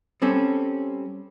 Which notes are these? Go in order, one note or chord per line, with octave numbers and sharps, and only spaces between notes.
G3 C4 C#4 A4